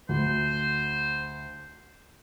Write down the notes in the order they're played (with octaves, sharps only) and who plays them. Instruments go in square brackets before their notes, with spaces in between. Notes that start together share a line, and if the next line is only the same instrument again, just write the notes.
[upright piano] D2 [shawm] C5